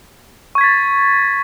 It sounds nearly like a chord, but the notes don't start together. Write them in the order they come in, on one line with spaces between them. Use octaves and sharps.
C#6 G#6 B6 A6